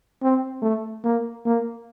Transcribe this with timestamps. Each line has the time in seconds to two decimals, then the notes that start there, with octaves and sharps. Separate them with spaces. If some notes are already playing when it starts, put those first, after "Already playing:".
0.22 C4
0.62 A3
1.04 A#3
1.46 A#3